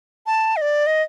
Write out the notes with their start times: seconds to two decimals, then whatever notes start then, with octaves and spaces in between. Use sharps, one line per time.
0.26 A5
0.56 D#5
0.61 D5
0.87 D#5